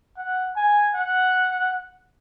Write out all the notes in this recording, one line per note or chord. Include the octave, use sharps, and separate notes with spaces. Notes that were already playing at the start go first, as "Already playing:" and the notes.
F#5
G#5
F#5